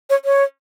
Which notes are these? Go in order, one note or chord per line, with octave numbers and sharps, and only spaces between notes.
C#5
C#5